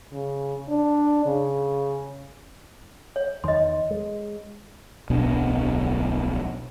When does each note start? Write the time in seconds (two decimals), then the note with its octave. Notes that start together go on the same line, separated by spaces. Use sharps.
0.12 C#3
0.69 D4
1.26 C#3
3.16 C#5
3.44 E2 D#3 D#5 C6
3.91 G#3
5.10 D1 B1 B2 D4